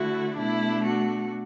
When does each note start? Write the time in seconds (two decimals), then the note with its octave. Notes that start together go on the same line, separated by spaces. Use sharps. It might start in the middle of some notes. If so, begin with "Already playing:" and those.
Already playing: D3 A3 E4 F#4
0.37 B2 A3 D4 E4
0.85 F#4